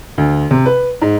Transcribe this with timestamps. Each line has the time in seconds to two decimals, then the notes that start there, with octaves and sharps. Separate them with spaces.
0.18 D2
0.51 C3
0.66 B4
1.02 G#2